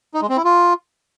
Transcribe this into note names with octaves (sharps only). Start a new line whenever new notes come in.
D#4
G#3
C4
E4
F4